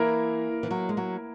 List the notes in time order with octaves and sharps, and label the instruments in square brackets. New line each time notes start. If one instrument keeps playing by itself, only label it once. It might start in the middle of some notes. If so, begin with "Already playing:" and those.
Already playing: [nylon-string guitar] E3 [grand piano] A#3 E4 A#4
[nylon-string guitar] E3
F#3
G#3
F#3